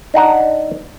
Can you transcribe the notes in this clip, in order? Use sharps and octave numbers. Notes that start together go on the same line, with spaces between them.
D4 D#4 F#5 A#5